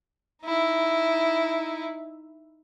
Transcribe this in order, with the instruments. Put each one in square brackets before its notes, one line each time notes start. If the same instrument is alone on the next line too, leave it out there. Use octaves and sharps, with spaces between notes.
[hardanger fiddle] D#4 E4